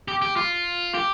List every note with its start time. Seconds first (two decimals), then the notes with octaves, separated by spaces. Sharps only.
0.08 G4
0.22 G4
0.36 F4
0.94 G4